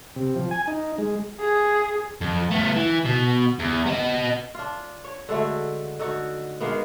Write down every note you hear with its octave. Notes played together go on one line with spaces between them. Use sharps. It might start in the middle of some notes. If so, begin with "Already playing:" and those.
C3
F3
G#5
D#4
G#3
G#4
F2
A3 B3
E3
B2
E2
B3 D#5
D4 F4
C#5
D3 G#3 A3 F#4
D3 D#4 F#4
D#3 G#3 A#3 B3